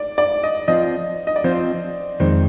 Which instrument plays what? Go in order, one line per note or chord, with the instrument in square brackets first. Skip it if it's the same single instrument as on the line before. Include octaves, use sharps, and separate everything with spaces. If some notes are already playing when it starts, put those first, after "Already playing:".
Already playing: [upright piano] D5
D5
D#5
[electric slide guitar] F3 C4 F4 [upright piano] D#5
[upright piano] D#5
D5
[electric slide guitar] F3 C4 F4 [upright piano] C5
[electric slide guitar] F2 D#3 G#3 C4 [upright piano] C5